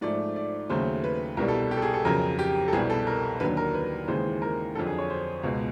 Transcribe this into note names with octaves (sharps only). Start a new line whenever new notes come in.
G#2 F3 A3 D5
D5
D#2 C#3 F#3 A3 C5
B4
C2 B2 G3 A#4
A4
G4
A4
G#4
A4
F2 C#3 F#3 A#4
G4
A4
C2 B2 G3 G#4
A4
A#4
D#2 D3 F#3 B4
A#4
B4
D#2 C#3 E3 G#3 C5
A#4
F2 D3 F#3 A4
G#4
C#5
C5
C#2 B2 G#3